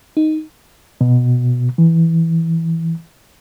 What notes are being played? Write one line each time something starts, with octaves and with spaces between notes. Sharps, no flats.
D#4
B2
E3